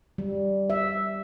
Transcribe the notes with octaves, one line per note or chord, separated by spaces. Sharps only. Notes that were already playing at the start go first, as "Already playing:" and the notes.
G3
E5